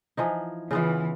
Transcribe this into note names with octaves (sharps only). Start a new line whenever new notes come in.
E3 F3 D#4
C#3 E3 B3 F4